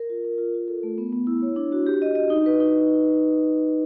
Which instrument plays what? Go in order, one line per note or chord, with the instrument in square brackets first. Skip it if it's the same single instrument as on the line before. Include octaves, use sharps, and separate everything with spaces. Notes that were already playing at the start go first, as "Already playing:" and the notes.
Already playing: [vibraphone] A#4
F4
A#4
F4
F4
A4
A3
B3
B3
E4
C#5
D4
F#4
G4
D#5
D#5
D#4
B4
D#4